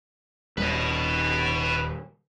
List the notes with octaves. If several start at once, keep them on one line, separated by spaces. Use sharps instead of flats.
D#1 G3 B4 D#5